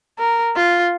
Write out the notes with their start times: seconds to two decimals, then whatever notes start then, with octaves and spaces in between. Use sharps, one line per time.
0.18 A#4
0.56 F4